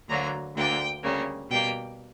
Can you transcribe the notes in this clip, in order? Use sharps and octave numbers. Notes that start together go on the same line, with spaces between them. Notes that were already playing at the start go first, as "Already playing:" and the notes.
D2 D3 F#3 A#3 A#5
D2 D3 A#3 G5
D2 C#3 G3 A#3
B2 G3 A#3 G5